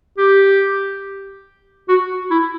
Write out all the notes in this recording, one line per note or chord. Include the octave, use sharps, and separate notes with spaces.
G4
F#4
E4